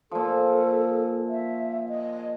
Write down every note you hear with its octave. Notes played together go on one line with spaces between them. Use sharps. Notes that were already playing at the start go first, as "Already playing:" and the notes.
A#2 F3 A4
E5
D#5